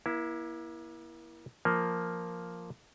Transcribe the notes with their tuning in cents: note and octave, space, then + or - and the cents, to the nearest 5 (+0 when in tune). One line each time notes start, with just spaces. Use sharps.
A#3 +40 E4 +0
F3 +0 A#3 +0